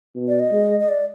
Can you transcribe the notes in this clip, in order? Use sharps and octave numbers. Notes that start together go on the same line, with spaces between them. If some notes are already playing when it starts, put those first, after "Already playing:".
B2
D5
D#5
G#3
D#5
D5